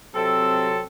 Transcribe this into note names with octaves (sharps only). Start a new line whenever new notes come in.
C3 F#3 C4 A4